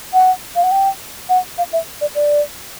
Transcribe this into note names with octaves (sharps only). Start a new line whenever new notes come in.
F#5
F5
F#5
G5
F#5
F5
E5
D5
D5